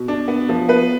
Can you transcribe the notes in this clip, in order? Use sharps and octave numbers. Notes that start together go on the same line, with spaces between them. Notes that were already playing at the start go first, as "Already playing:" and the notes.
Already playing: B2
D4
B3
F3
B3 B4